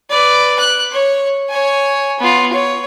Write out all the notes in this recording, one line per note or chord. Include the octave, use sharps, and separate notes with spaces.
B4 D5
F#6
C#5
C#5 G#5
B3 F4
C#5